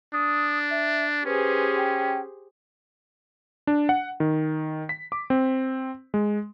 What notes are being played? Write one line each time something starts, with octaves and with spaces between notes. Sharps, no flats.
D4 D#6
E5
C#4 G4 G#4 B4 C5
G5
D4
F#5
D#3
B6
D6
C4
G#3